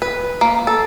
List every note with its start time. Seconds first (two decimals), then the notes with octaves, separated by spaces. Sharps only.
0.02 B4
0.41 A#3
0.67 A4